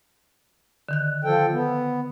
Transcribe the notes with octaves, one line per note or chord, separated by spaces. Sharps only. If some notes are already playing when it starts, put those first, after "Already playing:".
D3 D#3 F#6
F3 A4 G5
B3